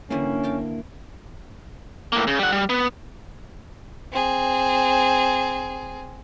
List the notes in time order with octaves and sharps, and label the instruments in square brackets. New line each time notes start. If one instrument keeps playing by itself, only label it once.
[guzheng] D3 E3 G3 [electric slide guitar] A#3 E4 [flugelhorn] C#4
[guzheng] A4 F5 G5
[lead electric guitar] A2 A#3
C#3
G3 F#5
G3
B3
[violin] C4 G#4